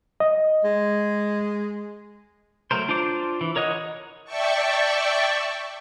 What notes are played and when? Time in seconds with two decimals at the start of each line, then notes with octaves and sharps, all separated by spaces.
0.20 D#5
0.64 G#3
2.71 F#3 A3 A#4 C5
2.89 D4 F4 C5 D6
3.41 E3
3.56 A#4 C#5 D#5 F#5
4.24 D5 E5 G5 A5 C#6